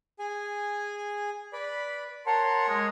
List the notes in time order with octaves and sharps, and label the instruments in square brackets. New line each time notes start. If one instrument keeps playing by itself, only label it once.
[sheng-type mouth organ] G#4 G#5
B4 D5 B5
[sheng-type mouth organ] A#4 C#5 F#5 [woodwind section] A5 C6
[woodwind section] G#3